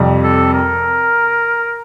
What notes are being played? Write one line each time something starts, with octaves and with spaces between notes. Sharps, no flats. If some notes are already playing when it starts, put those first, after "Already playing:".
Already playing: F2 C3 G3
A4
A#4